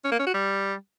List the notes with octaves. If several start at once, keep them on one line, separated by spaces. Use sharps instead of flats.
C#4
A#3
C#4
F#4
G3